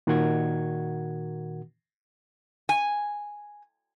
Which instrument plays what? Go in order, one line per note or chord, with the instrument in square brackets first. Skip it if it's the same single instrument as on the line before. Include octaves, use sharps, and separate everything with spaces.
[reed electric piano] A#2 D#3 F#4 A#4 F#5 G#6
[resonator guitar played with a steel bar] G#5